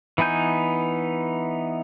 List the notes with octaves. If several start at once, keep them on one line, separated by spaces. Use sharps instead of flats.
E3 B3 D#4 G#5 G6